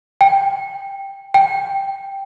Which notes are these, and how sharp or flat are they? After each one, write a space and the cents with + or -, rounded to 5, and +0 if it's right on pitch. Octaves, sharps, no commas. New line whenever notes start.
G5 +5
G5 +0